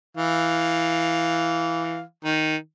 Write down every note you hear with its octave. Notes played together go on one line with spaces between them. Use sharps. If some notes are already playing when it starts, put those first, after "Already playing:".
E3 F5
D#3